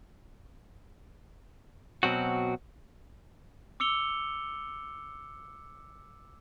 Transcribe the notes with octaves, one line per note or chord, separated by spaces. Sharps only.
B2 F#3 C4 F#4
D6 E6 C#7 F7 G7